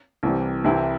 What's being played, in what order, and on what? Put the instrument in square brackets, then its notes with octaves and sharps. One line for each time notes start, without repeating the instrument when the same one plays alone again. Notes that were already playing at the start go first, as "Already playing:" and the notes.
[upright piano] C2 C3 E3 G3
C2 C3 E3 C4 E4